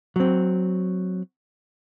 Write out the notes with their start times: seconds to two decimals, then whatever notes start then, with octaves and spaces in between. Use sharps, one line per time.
0.16 F#3 C4